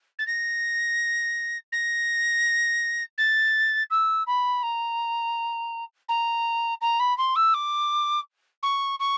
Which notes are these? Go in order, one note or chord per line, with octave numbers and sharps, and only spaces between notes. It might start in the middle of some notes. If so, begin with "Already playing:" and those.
A6
A#6
A#6
A6
E6
B5
A#5
A#5
A#5
B5
C6
E6
D6
C#6
C#6